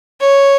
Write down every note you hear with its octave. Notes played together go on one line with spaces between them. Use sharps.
C#5